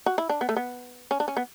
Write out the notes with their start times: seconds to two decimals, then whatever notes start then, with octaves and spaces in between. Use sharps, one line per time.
0.06 F#4
0.18 E4
0.29 D4
0.41 B3
0.49 A3
0.56 B3
1.11 C#4
1.20 D4
1.28 C#4
1.37 B3